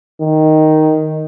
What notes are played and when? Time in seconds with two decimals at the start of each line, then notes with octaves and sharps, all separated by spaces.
0.21 D#3